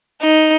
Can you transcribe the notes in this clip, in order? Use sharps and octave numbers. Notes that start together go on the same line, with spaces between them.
D#4